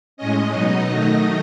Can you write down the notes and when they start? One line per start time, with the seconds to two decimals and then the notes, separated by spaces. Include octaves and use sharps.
0.17 A2 G#3 C#4 D#5
0.51 B2 F#3 B3 D#4
0.85 D#3 F#3 A3 D#4 D#5